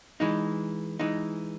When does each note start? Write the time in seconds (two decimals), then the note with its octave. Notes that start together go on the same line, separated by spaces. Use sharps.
0.20 E3 G#3 D#4
0.99 E3 G#3 D#4